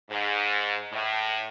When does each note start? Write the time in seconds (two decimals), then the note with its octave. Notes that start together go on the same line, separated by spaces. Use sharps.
0.10 G#2
0.92 A2